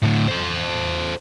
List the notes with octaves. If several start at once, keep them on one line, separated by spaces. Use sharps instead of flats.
A2 D3
A4 C5